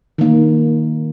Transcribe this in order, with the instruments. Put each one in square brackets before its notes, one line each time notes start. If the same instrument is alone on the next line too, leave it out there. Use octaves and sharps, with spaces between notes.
[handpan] D#3 A#3 D#4